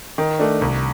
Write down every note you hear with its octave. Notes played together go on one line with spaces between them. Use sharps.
D#3
A3 D4
C2